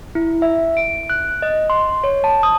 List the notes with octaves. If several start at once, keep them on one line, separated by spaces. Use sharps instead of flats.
E4
E5
D7
F#6
D#5
C6
C#5
A5
D#6